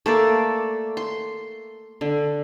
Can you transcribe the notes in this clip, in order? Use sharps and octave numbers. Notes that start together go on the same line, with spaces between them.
A3 A#3 D5
C6
D3